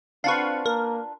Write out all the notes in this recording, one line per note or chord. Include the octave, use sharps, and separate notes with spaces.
C4 D4 F4 B4 F5 F#5 C#6
A#3 A#4